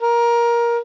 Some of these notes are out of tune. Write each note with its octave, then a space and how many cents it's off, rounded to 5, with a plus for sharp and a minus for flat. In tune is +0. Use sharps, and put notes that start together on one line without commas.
A#4 +15